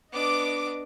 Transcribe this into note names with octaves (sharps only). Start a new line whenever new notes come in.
B3 D4 D#5 D6